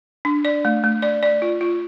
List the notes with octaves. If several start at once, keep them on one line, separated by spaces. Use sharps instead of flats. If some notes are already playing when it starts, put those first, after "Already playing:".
D4
D5
A3
A3
D5
D5
F4
F4